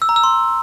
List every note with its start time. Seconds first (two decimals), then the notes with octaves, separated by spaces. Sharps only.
0.02 E6
0.09 A#5
0.16 E6
0.24 C6